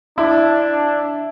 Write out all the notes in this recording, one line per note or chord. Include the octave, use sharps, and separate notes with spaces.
D4 E4